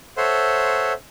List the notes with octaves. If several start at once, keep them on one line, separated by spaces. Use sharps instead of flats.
A4 C5 C#5 E5 F#5 C6